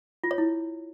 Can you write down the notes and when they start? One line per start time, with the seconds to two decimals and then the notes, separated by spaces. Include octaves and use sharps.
0.24 F4
0.31 C#5
0.38 E4